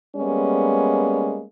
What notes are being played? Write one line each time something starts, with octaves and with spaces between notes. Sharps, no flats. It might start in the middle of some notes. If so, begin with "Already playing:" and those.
G3 G#3 A#3 B3 C#4